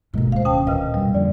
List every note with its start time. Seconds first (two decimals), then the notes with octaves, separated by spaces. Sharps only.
0.14 G#2 B2 D3 G#3 A#3
0.32 D1 D#2 C5 F5
0.45 C#4 G5 A5 D#6
0.67 A#2 D3 A#4 B4 D#5 F5
0.94 F#2 B2 G3
1.14 F2 A#2 D3 D5